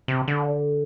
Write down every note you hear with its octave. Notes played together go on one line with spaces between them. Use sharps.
C3
D3